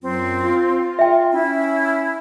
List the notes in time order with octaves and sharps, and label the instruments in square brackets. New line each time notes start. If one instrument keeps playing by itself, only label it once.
[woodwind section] F#2 F#3 F4 [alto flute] C4
[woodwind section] F4
[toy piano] E5 G5
[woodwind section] C#4 [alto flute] E4